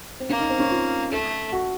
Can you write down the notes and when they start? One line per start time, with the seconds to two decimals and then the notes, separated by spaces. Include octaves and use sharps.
0.20 C4
0.29 A#3 C#4
0.39 D#4
0.50 C4
0.59 C#4
0.71 F4
1.12 A3 A4
1.52 F#4